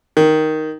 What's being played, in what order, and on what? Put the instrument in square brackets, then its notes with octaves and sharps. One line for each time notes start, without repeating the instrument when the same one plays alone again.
[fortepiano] D#3